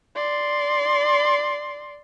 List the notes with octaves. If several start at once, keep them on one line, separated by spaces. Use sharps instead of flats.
D5 C6